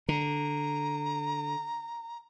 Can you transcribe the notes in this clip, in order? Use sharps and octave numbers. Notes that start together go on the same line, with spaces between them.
D3 A#5